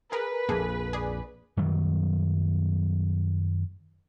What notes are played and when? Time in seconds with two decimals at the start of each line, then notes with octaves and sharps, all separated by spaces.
0.12 G#4 A#4 B4
0.49 A#1 F2 A#3 G#4 A4
0.93 G#4 D5
1.57 F#2 D#3 F#3 G3